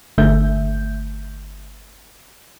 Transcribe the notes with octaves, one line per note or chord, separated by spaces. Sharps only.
G1 D3 A3 E5 G6